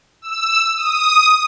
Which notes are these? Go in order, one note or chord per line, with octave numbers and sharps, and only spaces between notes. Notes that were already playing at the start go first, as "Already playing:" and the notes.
E6
D#6